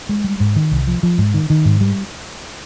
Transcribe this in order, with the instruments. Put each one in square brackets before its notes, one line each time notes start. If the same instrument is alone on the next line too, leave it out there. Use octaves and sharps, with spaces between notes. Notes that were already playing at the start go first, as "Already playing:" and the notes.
[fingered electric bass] G#3
G3
G#2
D#3
C2
F3
F3
G#2
D#3
D#3
G#2
G3